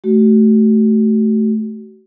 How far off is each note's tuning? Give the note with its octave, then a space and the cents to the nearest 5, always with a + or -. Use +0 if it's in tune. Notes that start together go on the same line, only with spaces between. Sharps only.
A3 -15 F#4 +35